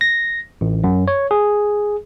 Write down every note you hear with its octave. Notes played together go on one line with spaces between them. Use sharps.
A#6
A1
F#2
C#5
G#4